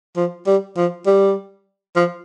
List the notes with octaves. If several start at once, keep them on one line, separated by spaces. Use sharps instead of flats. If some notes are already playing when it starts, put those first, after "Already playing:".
F3
G3
F3
G3
F3